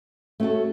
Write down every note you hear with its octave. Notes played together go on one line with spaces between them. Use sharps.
A3 C#4 F#4 A4